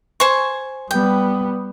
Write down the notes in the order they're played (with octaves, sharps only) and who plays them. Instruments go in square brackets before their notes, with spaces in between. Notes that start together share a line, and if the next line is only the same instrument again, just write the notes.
[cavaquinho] C5 G#5 C#6
[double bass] G3 B3 [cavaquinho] G5